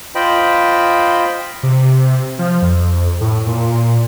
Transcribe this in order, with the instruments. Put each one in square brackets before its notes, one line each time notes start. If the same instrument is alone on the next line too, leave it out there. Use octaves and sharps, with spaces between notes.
[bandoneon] F4 C5 D#5 G5 B5
[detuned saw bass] C3
F3
F2
A2
A#2